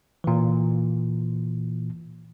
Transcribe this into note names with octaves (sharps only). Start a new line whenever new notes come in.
A#2 E3